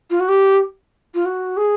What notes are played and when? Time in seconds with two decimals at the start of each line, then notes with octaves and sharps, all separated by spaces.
0.10 F4
0.20 F#4
0.29 G4
1.15 F4
1.25 F#4
1.57 G#4